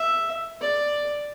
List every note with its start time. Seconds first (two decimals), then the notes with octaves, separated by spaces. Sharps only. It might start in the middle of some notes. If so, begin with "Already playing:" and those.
Already playing: E5
0.61 D5